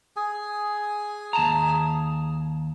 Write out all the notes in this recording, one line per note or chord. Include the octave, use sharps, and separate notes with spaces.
G#4 G#5
D#2 A5 A#5